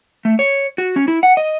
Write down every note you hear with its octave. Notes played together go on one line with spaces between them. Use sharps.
A3
C#5
F#4
C#4
E4
F#5
D#5